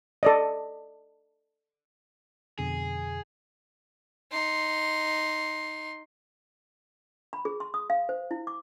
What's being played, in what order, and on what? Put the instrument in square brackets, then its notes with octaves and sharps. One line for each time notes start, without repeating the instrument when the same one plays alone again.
[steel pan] A4 D5 D#5
[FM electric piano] F2 B2 D3 [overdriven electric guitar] G#4
[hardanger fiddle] D#4 C6
[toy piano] B5
G#4
C6
D#6
F5
C5
E4
D6